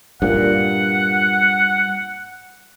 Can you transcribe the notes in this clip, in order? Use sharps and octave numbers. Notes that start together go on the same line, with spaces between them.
G2 A#2 F#5